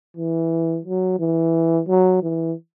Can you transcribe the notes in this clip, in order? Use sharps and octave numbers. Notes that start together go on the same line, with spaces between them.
E3
F#3
E3
F#3
E3